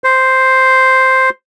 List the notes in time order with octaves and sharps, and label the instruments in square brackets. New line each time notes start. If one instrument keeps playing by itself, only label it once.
[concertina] C5